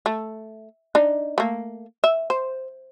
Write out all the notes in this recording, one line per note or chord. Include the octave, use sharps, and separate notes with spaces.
A3
D4 D#4
A3 A#3
E5
C5